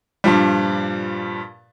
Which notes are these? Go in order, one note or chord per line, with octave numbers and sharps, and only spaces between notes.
G2 A#2 F3 G3